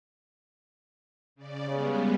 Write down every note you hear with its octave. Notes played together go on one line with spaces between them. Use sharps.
C#3 D5
C#3 G3 G#3 B3